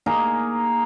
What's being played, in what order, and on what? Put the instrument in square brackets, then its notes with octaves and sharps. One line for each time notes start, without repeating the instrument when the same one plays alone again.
[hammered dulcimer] A#3 D#4 G#4 A#4